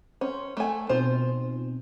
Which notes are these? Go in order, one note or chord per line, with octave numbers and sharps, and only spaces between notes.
C#4 C5
A3 G#5
B2 C4 D#4 F4 C5